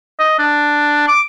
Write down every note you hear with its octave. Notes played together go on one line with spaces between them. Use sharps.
D#5
D4
D6